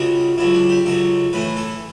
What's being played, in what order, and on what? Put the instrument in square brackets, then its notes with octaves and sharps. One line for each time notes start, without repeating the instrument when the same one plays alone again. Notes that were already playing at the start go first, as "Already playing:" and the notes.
Already playing: [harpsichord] C#2 C#3 G3 F#4
C#2 C#3 F#3 E4
D4
G4
C#2 C#3 F#3 A4
A2 E3 A3 B4
A4